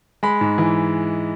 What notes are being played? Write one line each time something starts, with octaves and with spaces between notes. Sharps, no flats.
G#3 B5
G#2
E3